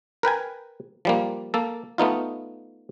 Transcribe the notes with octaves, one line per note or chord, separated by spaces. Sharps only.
A#4 B4 G5 G#5
F3 G3 A#3
A#3 A4
A3 B3 D#4 F4